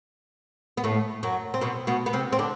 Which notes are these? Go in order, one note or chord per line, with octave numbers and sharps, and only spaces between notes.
B3
A2 A3
F#2 F#3
C4
B2 B3
B2 B3
B3
C3 C4
C4
D3 D4